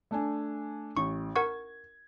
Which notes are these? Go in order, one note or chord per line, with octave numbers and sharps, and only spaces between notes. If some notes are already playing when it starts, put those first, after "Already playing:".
A3 D4 G#5
A1 C#6
A#4 F#5 C#6 G#6